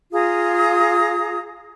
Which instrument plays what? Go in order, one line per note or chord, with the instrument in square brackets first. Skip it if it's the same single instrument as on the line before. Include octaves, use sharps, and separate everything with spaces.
[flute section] F4 G#4 A#5 D#6